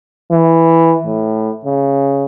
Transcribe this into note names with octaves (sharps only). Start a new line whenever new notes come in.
E3
A2
C#3